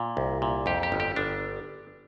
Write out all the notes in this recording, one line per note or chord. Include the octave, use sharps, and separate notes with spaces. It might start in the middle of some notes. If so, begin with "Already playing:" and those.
Already playing: A#2
C2
A#2
F2 G4
G4
G1
G4
G1 D4